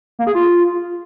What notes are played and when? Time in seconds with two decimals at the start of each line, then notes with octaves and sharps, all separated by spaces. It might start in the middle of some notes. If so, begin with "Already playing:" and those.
0.19 A#3
0.27 G#4
0.35 F4